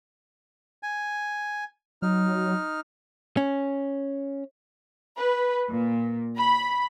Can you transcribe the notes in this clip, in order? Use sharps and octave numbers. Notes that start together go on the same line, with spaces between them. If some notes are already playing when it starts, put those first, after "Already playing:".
G#5
F#3 D#4 F6
C#4
B4
A#2
B5